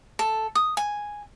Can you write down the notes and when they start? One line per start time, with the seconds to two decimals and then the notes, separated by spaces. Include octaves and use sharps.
0.19 A4
0.55 D#6
0.77 G#5